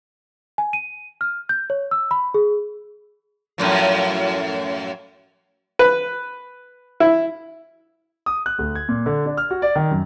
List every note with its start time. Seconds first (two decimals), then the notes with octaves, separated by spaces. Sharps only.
0.58 G#5
0.73 D#7
1.21 F6
1.49 G6
1.70 C#5
1.91 E6
2.11 B5
2.34 G#4
3.58 F#2 A2 F3
5.79 B4
7.00 E4
8.26 D#6
8.46 F#6
8.59 D2
8.75 G#6
8.89 A#2
9.06 D3
9.26 D4
9.37 F6
9.51 F#4
9.62 D5
9.75 D#3
9.91 F#2